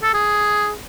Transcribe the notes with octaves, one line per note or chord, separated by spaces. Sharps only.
A4
G#4